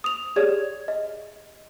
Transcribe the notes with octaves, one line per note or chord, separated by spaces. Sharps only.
D#6 F7
G4 G#4 C#5 D5 G#6
D#5